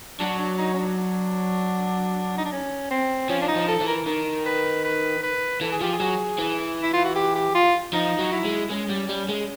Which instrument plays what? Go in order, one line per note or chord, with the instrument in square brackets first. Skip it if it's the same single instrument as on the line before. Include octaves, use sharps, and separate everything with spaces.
[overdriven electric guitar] F#3 [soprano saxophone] D4
[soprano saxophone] D4
D#4
C#4
D4
D4
D#4
D4
C#4
C4
[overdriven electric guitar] F3 [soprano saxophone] C#4
[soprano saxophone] D4
D#4
[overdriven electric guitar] F3
[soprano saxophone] A4
[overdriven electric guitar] E3
[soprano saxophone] A#4
[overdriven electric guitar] D#3 [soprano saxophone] A#4
[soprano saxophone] B4
B4
B4
[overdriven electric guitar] E3 [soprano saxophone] A4
[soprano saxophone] G#4
[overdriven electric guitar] F3 [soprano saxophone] G4
[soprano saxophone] G#4
[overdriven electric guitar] F#3
E3
[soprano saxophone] E4
F4
F#4
G4
G4
F4
[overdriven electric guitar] F3 [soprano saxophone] D#4
[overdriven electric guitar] F#3
[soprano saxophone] E4
[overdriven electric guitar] G#3
[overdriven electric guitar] G#3 [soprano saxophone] C#4
[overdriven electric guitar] G3
G3
G#3